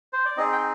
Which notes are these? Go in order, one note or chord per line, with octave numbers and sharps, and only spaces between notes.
C5
D5
C4 D#4 G#4 D#5
G5